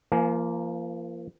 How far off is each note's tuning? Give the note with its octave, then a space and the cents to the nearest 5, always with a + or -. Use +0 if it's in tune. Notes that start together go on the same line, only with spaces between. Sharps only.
F3 -35 A#3 +0 G#5 +25